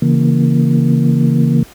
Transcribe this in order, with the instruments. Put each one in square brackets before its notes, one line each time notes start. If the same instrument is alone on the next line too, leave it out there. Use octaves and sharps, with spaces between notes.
[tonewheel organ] C#3 E3 A#3